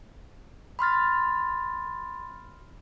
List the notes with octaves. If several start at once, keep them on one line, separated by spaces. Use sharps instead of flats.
B5 C6 F6 A6